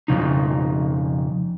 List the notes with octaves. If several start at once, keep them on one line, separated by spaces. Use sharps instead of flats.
F2 C#3 D#4